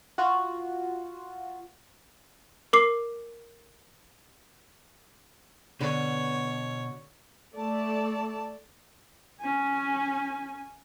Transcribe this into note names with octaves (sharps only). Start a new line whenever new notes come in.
F4 F#4
A#4 D6 C7
B2 D3 C#5
A3 A4 D5 A5
C#4 G#5